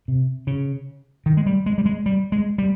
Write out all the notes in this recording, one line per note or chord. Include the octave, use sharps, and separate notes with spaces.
C3
C#3
D#3
G#3
G3
G#3
G3
G#3
G3
G#3
G3